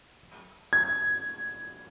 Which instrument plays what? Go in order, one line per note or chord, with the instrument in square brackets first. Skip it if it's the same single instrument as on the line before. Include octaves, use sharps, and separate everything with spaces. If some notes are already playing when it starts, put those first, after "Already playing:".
[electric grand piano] G#6